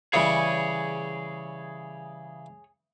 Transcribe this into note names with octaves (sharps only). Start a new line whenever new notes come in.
C#3 E3 G3 G#4 C#5